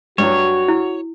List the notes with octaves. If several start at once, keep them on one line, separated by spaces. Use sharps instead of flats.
G2 F#3 F#4 C#5
E4